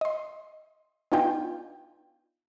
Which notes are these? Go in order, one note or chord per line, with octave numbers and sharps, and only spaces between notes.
D#5 C6
B3 D4 D#4 F4 G5 G#5